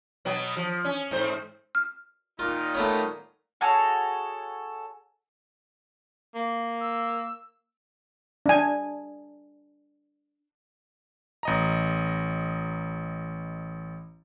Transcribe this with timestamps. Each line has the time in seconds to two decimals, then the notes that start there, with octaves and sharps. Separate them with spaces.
0.25 B2 F#3 B3
0.57 F3
0.85 C#4
1.11 G#2 C5
1.75 F6
2.39 A#2 D#3 D#4 F4
2.75 A3 B3 C#5
3.61 F#4 G#4 A4 C#5
6.35 A#3
6.81 E6
8.46 D4 G#5
11.43 A1 D#5 A#5